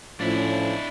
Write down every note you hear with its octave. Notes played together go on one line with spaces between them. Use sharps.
A2 F3 C#4 D4 E4